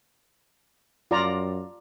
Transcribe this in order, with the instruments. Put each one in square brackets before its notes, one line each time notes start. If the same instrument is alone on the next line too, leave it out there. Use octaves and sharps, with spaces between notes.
[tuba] F#2 [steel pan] F4 D5 A#5